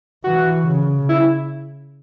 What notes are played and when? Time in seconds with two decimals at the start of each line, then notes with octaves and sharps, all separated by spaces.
0.24 E3 F#4
0.66 C#3
1.09 E4